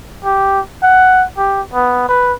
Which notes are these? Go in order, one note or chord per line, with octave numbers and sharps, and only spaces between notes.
G4
F#5
G4
B3
B4